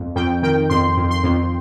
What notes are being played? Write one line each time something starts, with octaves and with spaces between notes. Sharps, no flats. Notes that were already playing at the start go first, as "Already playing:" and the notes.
Already playing: F2
F2 G5
D#3 G5
F2 C6
F2
C6
F2